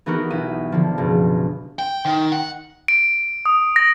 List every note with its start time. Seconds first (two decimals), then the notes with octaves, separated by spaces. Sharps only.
0.06 E3 B3 D#4 F#4 G4 A#4
0.30 B1 E4 E5 D#7
0.72 D3 F3
0.98 F#1 B2
1.79 G5
2.05 D#3
2.32 F#5
2.88 D7
3.46 D#6
3.76 A#6